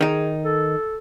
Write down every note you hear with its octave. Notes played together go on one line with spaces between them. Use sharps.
D#3 D#4 G#4
A4